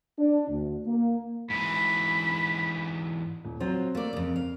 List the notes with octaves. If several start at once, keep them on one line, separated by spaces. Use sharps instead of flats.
D4
D2
A#3
G#2 E3 B5
D#1
F#3 C4 F4 C5
A3 A#3 D5
F2 C#3
F5